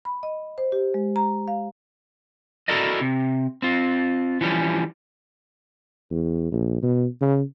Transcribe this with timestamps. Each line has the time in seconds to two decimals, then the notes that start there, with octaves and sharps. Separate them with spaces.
0.05 B5
0.23 D#5
0.58 C5
0.72 G4
0.94 G#3
1.16 A#5
1.48 F5
2.68 E4 F#4 A4 A#4 D5 D#5
3.01 C3
3.62 C4 F4
4.41 E3 F3 G3 C#4
6.10 E2
6.52 A#1
6.82 B2
7.21 C#3